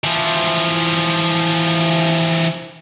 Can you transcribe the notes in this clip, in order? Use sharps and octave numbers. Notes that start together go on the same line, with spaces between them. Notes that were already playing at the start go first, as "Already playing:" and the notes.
E3 F3